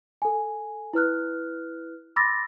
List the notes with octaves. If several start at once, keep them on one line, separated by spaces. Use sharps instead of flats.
A4 G#5
E4 B4 F6 F#6
B5 C6 D6 E6 A6 A#6